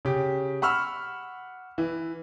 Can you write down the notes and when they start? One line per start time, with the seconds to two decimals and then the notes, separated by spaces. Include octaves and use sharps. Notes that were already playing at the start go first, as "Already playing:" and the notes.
0.05 C#3 G4
0.62 F#5 B5 C#6 E6 F6
1.78 E3